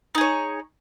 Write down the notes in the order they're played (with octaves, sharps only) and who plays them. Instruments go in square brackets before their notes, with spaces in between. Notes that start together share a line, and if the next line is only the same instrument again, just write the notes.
[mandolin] D#4
G#4
C#5